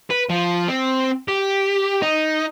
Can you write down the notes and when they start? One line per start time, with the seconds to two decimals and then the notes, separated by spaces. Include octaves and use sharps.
0.11 B4
0.30 F3
0.68 C4
1.28 G4
2.02 D#4